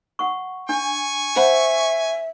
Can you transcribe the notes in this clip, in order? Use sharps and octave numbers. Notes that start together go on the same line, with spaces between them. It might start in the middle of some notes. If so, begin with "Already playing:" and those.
F#5 C#6
D4 G#5 C#6
C5 E5 F#5 B5